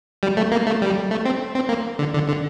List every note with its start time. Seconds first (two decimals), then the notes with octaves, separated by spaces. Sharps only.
0.23 G3
0.37 A3
0.52 A#3
0.67 A3
0.82 G3
1.11 A3
1.25 C4
1.55 C4
1.69 A#3
1.99 D3
2.14 D3
2.28 D3